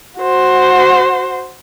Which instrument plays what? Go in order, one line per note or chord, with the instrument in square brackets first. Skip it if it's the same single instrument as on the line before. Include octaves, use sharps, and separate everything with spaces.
[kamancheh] F#4 C5